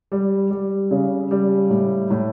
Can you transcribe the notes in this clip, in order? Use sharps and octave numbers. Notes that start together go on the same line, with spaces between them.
G3
G3
C#3
G3
A2
A2